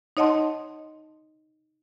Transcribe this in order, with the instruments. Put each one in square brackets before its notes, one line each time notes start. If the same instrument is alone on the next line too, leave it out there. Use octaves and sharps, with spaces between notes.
[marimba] D#4 C#5 D#5 F#5 A5 C6